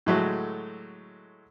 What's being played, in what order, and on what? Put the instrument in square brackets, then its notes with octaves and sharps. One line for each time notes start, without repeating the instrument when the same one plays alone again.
[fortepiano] A2 D3 F#3 G#3 A3 F#4